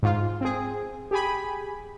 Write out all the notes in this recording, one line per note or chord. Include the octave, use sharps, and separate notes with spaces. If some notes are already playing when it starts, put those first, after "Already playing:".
G#2 F4
C4 G#4
G4 G#4 G#5 B5